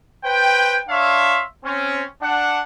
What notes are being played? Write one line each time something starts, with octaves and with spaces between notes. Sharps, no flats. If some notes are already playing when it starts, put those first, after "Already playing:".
B4 C5 G5
D4 C#5 E5 F5 C6
C4 C#4
D4 F#5